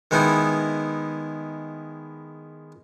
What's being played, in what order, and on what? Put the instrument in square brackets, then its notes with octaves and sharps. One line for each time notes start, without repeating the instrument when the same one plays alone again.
[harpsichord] D#3 G#3 B3 D#4 E4